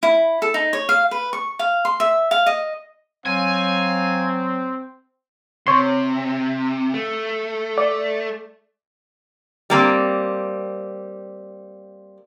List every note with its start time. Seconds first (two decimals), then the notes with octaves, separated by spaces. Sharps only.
0.03 E4
0.42 A4
0.54 D#4
0.73 C#5
0.89 F5
1.11 B4
1.33 C#6
1.59 F5
1.85 C6
2.00 E5
2.31 F5
2.46 D#5
3.26 F#3 C4 F5 G#5
5.67 C3 C#5 C6
6.94 A3
7.78 D5
9.70 G3 A#3 C4